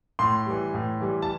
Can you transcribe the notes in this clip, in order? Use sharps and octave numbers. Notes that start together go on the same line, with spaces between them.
A2 C6
E3 G3
A2
E3 G3
A5